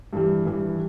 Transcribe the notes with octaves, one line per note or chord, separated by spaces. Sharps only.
G2 E3 G3
G2 E3 G3